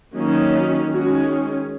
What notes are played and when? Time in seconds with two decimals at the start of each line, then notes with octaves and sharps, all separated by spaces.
0.15 D#3 F#3 A#3 C#4
0.91 D#3 G#3 C#4 F#4